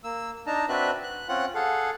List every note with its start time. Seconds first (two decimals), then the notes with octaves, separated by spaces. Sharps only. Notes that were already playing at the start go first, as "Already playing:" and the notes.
0.04 A#3 E6
0.47 D4 D#4 A5 A#5
0.69 C4 D4 F#4 B4 E5 F#6
1.03 F#6
1.29 C4 C#4 F4 F#5 F#6
1.55 G#4 A4 F5 F#5